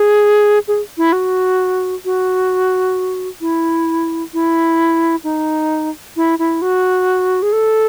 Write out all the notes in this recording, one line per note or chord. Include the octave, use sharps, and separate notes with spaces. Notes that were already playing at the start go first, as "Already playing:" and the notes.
Already playing: G#4
G#4
E4
F#4
F#4
E4
E4
D#4
E4
E4
F#4
G#4
A4